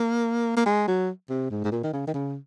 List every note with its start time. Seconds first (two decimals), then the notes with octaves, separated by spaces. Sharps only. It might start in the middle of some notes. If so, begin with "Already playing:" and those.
Already playing: A#3
0.56 A#3
0.66 G#3
0.87 F#3
1.29 C3
1.51 G#2
1.64 G#2
1.72 A#2
1.83 D#3
1.93 C#3
2.07 D#3
2.14 C#3